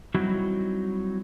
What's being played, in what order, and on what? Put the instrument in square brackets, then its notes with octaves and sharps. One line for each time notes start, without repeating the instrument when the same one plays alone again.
[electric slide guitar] F#3 G3 C4 D#4 E4 F#4